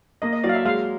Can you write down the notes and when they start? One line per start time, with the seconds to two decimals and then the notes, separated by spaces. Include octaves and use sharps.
0.22 A#3 D#5
0.33 D#5
0.44 F#3 D5
0.49 F5
0.55 E5
0.65 G#3 F5